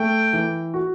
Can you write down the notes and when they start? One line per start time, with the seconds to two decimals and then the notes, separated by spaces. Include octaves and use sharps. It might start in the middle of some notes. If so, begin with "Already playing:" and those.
Already playing: A3 G5
0.33 E3
0.74 F#4